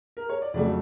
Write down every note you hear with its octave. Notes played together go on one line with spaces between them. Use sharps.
A#4
C#5
D5
F2 C#3 F#3 A3 D5